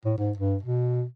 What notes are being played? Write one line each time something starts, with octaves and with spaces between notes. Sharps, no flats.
A2
G#2
G2
B2